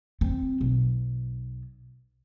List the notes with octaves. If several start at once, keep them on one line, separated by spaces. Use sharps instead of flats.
C4
B1